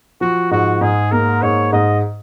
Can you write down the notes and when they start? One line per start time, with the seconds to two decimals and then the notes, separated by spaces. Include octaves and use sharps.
0.21 F3 F#4
0.51 G#2 F#4
0.81 G#2 G#4
1.12 A#3 A#4
1.42 G#2 C#5
1.73 G#2 D#5